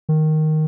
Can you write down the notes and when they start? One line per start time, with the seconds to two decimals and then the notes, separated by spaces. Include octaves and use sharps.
0.09 D#3